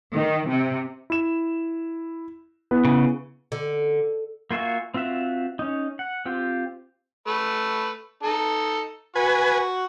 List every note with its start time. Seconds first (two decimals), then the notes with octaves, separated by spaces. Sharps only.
0.13 D#3
0.48 C3
1.10 E4 E7
2.71 B3 E4 B4
2.85 C#3
3.52 D3
4.51 A#3 F4 F#4 E5 G#5
4.94 C4 F4 F#4 E5
5.59 C#4 D#4
5.99 F#5
6.26 C4 F4 G4
7.27 A3 B4
8.23 D#4 A4
9.15 F#4 B4 G#5